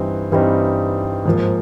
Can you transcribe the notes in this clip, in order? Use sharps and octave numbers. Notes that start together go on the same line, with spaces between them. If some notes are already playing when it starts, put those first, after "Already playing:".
Already playing: G2 E3 G3 C4 D#4
G2 E3 G3 C4 D#4
G#2 F3 A#3